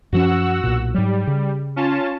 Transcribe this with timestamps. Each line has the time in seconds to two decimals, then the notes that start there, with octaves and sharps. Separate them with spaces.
0.12 F#2 F3 C#4 F#4 F#5 E6
0.64 B1 A#2
0.94 G#2 F#3 G3
1.27 C#3
1.76 C#4 F4 A5